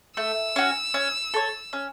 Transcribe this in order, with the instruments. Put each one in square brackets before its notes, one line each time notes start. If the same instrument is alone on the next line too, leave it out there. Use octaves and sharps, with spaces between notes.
[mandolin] A3 [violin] E6
[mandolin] C#4 F#4
C#4
A4 C#5
C#4